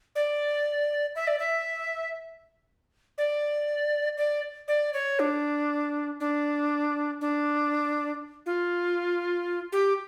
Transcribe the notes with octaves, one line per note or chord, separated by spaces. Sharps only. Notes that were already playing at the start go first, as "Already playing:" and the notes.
D5
E5
D5
E5
D5
D5
D5
C#5
D4
D4
D4
F4
G4